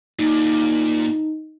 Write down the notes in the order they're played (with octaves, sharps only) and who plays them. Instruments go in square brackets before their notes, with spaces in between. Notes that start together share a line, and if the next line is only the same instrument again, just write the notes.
[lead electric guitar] A#2 [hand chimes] D#4